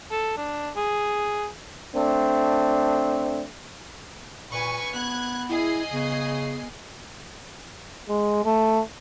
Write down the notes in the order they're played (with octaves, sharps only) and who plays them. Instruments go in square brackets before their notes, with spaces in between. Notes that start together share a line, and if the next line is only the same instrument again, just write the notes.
[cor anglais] A4
D4
G#4
[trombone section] A3 C4 D4
[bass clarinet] A#2 [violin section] B4 G#5 C#6
[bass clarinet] B3 [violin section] F#6 G#6
[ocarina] E4 [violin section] G#4 D#5 C7
[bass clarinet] C#3 [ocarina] B3
[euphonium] G#3
A3